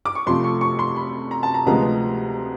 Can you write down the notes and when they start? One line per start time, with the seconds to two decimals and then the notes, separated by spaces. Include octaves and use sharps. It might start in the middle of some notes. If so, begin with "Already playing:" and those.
0.05 D6
0.15 C#6
0.26 F2 C3 F3 A3 C6
0.44 C#6
0.61 C#6
0.79 C6
0.96 B5
1.31 A#5
1.43 A5
1.54 A#5
1.66 D2 C3 F3 G#3 B3 A#5